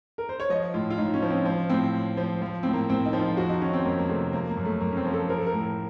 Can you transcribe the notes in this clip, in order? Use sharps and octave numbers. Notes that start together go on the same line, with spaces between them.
A#4
C5
C#5
F3 D#5
A2 F4
F4
A2 D#4
C#4
F3
C4
F3
A2 C4
A2
F3
F3
A2 C4
A#3
A2 C4
D#4
F3
F4
F2 F#4
D#4
D#3 C#4
C4
F2 A#3
A#3
C3 A3
F3 A#3
A#3
F#2
A3
F#2 A#3
C#4
C4
F3
A4
F3 A#4
A4
A#4
A2